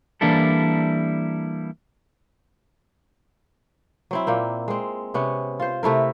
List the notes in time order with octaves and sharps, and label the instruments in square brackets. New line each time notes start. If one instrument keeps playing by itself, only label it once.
[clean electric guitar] E3 G3 A#3 D4 E4 A4
[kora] F#3 C4 E4
A#2 A#3 G5
G#3 C4
C3 B3 C#4
F4 C5
C3 A3 E4 A#4